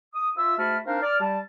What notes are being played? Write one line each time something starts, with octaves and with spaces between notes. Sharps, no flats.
D#6
F4 E5 E6
G#2 A3 F#4 A5 B5 F6
C4 D4 D#4 A#4 F5
D5 F6
G3 A5